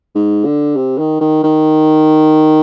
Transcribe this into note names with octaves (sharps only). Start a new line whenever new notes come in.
G#2
D3
C3
D#3
D#3
D#3